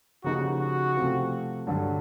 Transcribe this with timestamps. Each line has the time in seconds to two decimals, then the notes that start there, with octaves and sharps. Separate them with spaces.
0.24 C#3 F3 A#3 D#4 F#4 G4
0.60 F#4
0.95 C3 F3 A3 C4 F4
1.67 G2 D3 F#3